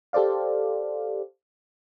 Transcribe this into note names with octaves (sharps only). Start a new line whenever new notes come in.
G4 A4 C5 D5 F5